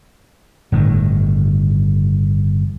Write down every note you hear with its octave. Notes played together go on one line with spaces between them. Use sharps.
G1 A2 D#3